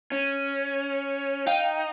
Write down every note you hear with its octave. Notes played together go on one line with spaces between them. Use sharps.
C#4
D#4 F5 G5